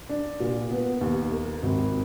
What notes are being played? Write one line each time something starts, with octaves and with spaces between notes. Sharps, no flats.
D4
A#2
B3
D#2
A#3
G#1